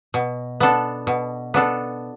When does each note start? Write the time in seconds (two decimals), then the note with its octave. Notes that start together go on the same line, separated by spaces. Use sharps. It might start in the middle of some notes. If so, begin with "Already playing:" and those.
0.14 B2
0.60 B3 D4 A4
1.07 B2
1.54 B3 D4 A4